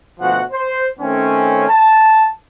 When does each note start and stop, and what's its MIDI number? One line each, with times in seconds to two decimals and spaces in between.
0.20 0.40 38
0.20 0.40 47
0.20 0.40 53
0.20 0.40 66
0.20 0.40 78
0.52 0.87 72
1.00 1.65 51
1.00 1.65 57
1.00 1.65 60
1.00 1.65 61
1.69 2.28 81